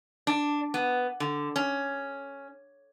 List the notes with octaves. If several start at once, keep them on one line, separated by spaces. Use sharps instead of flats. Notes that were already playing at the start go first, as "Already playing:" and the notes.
D4
B3
D3
C#4